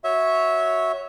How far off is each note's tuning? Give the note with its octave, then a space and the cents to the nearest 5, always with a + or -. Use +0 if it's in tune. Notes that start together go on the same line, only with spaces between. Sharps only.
F#4 -5 C#5 +0 E5 -15